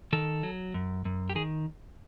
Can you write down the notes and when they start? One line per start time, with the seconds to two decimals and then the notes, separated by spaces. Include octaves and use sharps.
0.13 D#3 A4
0.43 F#3
0.74 F#2
1.05 F#2
1.30 G4
1.35 D#3 G#4